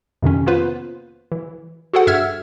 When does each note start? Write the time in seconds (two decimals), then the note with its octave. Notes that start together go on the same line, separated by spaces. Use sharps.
0.22 F2 C3 D#3 C#4
0.46 A#3 B3 F4 B4 C5
1.32 E3
1.93 F#4 G#4 A4 C5 F#5
2.07 G2 E5 E6 F6 G#6